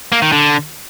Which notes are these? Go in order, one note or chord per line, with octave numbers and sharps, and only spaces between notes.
A#3
D#3
D3